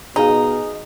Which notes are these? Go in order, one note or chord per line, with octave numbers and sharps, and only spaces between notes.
B2 D#4 G#4 F5